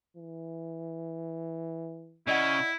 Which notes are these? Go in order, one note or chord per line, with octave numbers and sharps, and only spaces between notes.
E3
C#3 E4 D5 D#5 F#5